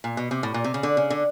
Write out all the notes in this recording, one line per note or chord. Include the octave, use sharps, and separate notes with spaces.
A#2
B2
C3
A2
A#2
C3
C#3
D3
C#3
D3